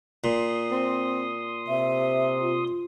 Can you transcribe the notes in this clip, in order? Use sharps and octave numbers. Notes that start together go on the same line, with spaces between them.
A#2 C6 D#6
C4
C3 E5
F4